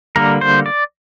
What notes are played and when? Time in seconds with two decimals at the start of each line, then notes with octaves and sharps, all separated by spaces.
0.16 D3 G3 A#3 A#4
0.41 C5
0.66 D5